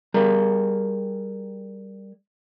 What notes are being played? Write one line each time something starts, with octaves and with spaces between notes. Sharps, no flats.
G3 G#4 A#4 A#5